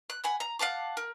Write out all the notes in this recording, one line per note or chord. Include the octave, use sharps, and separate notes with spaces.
F#6
F#5 G#5 B5
A#5
F5 F#5 A5 D6
A#4